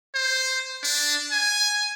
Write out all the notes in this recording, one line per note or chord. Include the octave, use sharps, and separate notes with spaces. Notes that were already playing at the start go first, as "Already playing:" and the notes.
C5
D4
G#5